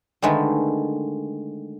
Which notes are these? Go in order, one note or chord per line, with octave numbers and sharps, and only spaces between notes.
D3 D#3 G#3 A3 B4